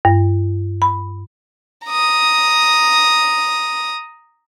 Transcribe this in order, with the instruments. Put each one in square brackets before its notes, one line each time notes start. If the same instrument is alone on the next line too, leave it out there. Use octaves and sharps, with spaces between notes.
[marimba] G2
B5
[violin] A#5 D#6